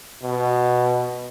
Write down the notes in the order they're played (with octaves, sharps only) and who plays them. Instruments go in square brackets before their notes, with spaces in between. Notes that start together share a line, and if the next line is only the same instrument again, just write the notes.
[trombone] B2